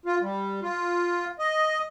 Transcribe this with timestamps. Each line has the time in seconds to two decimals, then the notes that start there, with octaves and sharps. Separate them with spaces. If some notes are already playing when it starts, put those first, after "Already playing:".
0.06 F4
0.21 G3
0.62 F4
1.39 D#5